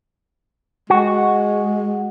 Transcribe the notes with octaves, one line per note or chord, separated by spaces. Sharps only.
G#3 F#4